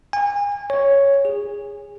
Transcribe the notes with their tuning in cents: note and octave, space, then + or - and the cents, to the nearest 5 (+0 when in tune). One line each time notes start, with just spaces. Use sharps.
G#5 -35
C#5 +0
G#4 -20